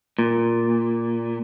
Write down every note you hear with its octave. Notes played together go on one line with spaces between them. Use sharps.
A#2